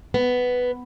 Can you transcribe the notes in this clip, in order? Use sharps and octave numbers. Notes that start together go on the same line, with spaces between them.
B3